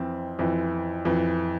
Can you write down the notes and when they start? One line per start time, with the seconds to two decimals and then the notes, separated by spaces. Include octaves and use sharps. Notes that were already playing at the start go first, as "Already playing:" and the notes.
Already playing: F2 E3 C4
0.39 F2 E3
1.05 F2 E3